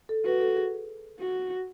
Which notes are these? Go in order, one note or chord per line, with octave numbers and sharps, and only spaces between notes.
A4
F#4 B4
A4
G#4
F#4